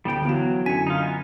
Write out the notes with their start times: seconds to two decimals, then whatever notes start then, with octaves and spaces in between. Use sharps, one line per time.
0.05 D2 G3 B3 G5 D7
0.25 E3 F#3 B3 E4 F#4 E7
0.66 F#2 D3 G#5 B6 C#7
0.87 D#4 F4
1.03 B3 G#5